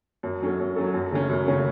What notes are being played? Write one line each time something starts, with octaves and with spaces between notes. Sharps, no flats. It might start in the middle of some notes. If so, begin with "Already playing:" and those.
F#2
F#3 C#4 A4
F#2
F#3 C#4 A4
F#2
C#3 A3 C#4
F#2
C#3 A3 C#4